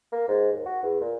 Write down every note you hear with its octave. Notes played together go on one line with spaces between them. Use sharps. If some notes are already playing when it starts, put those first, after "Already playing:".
A#3
G#2
D#2
F#4
E2
A#2